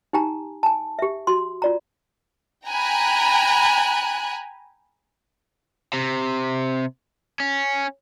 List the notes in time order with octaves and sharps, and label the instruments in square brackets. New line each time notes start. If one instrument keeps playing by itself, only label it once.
[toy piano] D#4 G4 G#5 A#5
G#5 A5
G4 E5
F#4 C6
F4 D5 A#5
[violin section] G5 G#5 A#5 B5 F#6
[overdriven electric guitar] C3
C#4